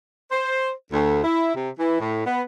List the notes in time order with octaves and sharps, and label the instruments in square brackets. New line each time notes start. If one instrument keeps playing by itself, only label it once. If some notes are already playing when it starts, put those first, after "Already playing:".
[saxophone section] C5
D2
E4
C3
E3
A2
B3